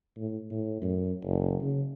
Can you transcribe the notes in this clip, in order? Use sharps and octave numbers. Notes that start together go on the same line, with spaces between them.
A2
A2
F#2
F#1
C#3